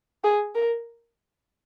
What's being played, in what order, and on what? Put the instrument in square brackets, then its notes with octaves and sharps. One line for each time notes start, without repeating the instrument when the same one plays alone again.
[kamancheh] G#4
A#4